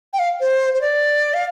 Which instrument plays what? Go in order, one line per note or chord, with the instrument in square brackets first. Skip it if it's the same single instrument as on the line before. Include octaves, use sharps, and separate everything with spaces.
[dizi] G5
F5
C5
C5
D5
F5